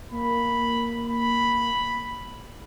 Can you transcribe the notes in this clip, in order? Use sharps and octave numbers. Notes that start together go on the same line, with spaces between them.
A#3 B5
B5